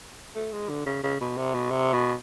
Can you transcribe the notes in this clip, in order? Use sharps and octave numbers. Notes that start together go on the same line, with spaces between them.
A3
G#3
D3
C#3
C#3
B2
C3
B2
C3
B2